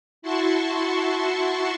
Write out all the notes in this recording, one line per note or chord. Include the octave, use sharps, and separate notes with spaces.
E4 F#4 A5 C6 C#6